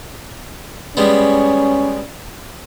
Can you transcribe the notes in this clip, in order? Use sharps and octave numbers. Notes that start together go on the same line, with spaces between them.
G3 G#3 B3 C#4